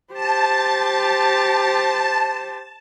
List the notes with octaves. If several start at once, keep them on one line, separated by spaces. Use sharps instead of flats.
G4 C5 A5